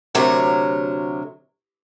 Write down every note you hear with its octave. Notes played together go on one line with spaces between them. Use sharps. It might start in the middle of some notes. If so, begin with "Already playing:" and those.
D2 C3 F#3 A#4 C#5